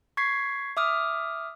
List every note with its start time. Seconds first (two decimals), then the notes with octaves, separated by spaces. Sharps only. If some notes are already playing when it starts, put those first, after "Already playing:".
0.17 C#6 G#6 B6 C7
0.77 E5 D6 D#6 F6